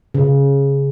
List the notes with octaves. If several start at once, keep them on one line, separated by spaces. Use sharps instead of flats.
C#3